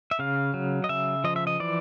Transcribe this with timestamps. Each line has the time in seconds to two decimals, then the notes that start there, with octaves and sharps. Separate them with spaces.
0.11 E5
0.19 C#3 F5
0.54 F#3
0.84 D#5
0.89 C#3 E5
1.24 F3 D#5
1.36 E5
1.47 D#5
1.60 E3 D5